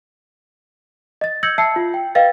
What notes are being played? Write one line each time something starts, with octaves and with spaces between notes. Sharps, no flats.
D#5 A6
E6 G6 G#6 A#6 C#7 F#7
E5 A5 E6 C7 C#7
F4
G5
B4 D#5 F5 G5 G#6 A6